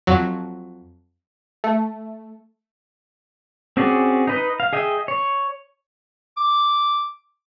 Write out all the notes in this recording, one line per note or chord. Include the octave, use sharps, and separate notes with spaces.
F2 F#3
A3
C4 C#4 F#4 G#4 D5
D#4 B4 D#5
F5
G#4 D#5 E5 G5
C#5
D6